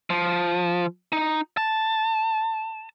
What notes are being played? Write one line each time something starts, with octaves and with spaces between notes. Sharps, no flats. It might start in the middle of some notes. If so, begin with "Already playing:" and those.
F3
D#4
A5